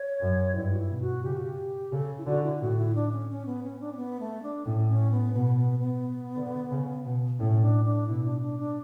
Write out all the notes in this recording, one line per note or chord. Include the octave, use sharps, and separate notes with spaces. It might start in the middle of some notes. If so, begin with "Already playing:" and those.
Already playing: C#5
F#2
G2 E4
F#4
E4
B2
F#4
C#3 G4
F#4
G4
C#3 A4
E4
D3 F#4
E4
E4
A2 F#4
E4
D4
C#4
C#4
B3
C#4
D4
C#4
B3
A3
D4
A2 C#4
C#4
B3
B2 B3
B3
B3
D3
C#3
B2
A2 C#4
D4
D4
B2 E4
D4
D4
D4